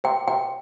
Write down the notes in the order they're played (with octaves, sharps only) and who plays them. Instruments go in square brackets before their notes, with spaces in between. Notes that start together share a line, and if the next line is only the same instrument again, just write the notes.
[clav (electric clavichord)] C3 [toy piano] G5
[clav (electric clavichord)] C3 [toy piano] G5